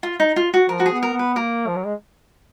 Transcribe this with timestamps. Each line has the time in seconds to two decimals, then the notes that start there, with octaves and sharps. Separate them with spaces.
0.03 F4
0.20 D#4
0.36 F4
0.54 F#4
0.69 F3 A#4
0.80 F#4
0.86 G#4
0.92 B3
1.03 A#4
1.13 B3
1.19 B4
1.36 A#3 A#4
1.67 F3
1.76 F#3
1.84 G#3